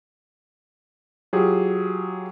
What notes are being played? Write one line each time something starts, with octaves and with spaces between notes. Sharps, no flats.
F#3 F4 G4 G#4